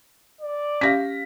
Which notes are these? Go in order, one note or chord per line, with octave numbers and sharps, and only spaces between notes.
D5
C#4 G4 F5 A#6 B6